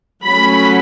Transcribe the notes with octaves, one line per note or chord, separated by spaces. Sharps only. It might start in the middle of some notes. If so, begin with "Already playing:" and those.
F#3 A3 C#4 B5